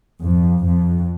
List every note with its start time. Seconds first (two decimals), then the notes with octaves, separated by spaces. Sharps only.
0.22 F2
0.66 F2